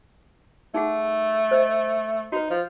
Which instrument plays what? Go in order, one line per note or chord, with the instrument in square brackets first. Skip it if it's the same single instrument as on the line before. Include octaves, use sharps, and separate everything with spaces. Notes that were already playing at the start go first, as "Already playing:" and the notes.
[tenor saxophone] A3 [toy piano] D#4 G#4 F#5
[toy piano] C5 D#5
[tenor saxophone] D#4 [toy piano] F#4 B4
[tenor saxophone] F3